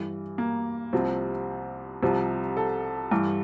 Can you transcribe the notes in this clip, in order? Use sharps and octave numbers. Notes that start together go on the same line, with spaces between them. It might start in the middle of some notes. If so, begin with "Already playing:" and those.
Already playing: G2 E3
A#3
C2 C3 F3 C4
C2 C3 F3
A4
G2 E3